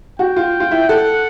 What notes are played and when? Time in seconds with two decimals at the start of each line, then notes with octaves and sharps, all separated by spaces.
0.19 F#4 G5
0.36 F4
0.60 F4
0.71 E4
0.89 A4 F#5